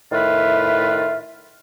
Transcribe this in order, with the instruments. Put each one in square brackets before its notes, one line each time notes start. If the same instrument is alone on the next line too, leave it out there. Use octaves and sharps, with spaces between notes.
[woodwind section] A2 D#3 F4 B4 E5